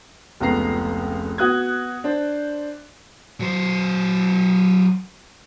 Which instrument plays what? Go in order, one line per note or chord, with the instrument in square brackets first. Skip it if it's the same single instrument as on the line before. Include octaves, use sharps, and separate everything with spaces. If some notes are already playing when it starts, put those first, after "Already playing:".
[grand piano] F1 C#2 C#3 B3 A#5 C7
B3 F#4 D#6 F#6 G#6
D4 C5
[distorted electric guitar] F#3 C5